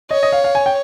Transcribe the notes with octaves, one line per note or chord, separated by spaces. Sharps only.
C#5 D#5
D#5
F5
F5
G#5
G5